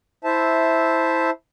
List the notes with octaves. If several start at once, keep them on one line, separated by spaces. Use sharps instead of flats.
E4 C5 E5 A5